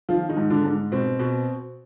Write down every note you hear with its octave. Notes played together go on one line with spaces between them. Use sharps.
D#3 F3 F4
D#3 D#4
G#2
D3 D4
G#2
B2 C4
B2